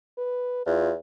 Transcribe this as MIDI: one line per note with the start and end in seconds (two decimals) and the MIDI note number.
0.18 0.62 71
0.66 0.95 40
0.66 0.91 65